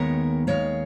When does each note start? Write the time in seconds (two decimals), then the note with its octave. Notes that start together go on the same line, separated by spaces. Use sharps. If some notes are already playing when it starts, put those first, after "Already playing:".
Already playing: D#2 D#3 G#3 B3 A#4 C#5
0.47 D#2 D#3 G#3 C#5 F5